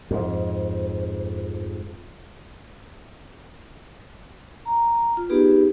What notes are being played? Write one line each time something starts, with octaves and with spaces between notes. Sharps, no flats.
F2 G#2
A#5
F4
B3 D#4 G4 G#4 B4